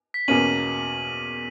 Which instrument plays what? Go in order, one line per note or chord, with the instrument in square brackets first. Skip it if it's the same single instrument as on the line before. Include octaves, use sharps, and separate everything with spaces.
[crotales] B6
[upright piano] E2 B2 A#3 C#4 [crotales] D#7 F#7